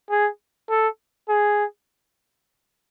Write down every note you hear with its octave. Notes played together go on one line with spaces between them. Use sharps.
G#4
A4
G#4